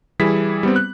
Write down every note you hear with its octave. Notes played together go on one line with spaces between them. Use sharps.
E3 G3 E4 G#4 B6
G3 B3 C4
F#6